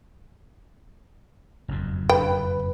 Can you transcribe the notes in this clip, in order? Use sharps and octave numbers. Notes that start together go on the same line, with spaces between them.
F#1 F2 G#2
B4 G5